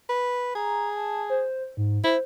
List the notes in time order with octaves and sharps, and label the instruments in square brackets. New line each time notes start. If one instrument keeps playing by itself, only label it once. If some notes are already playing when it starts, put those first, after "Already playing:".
[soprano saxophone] B4
[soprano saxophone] G#4 [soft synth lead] A#5
[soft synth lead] A5
C5
G#2
[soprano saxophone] E4 [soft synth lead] C5